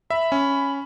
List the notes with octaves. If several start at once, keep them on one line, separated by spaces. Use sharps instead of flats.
E5 B5
C#4